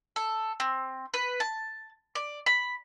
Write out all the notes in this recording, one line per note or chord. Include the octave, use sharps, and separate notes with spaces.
A4
C4
B4
A5
D5
B5